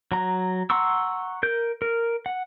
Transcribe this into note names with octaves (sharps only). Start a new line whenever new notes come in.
F#3 A#5
F#5 A#5 C6 C#6 E6
A#4 G6
A#4
F#5